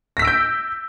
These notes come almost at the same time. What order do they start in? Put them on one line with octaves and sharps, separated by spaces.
A#6 B6 E6 D7 G6